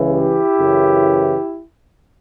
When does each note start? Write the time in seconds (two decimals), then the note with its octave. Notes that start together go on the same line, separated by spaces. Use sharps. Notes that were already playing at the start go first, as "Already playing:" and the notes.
Already playing: C#2 C#3 E3
0.11 E4 G4
0.59 F#2 C#3 E3